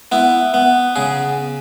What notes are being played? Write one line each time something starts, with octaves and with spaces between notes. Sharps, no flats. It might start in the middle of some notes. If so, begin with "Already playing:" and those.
B3 E4
B3
C#3 G#4